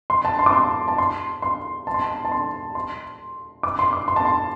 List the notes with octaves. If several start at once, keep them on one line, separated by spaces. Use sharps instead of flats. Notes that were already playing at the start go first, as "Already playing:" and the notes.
C6
A5
C6
D6
C6
A5
C6
C6
A5
C6
A5
A5
C6
C6
D6
C6
D6
C6
A5
C6